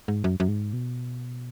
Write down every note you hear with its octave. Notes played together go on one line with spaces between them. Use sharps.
G#2
F#2
F#2
G#2
B2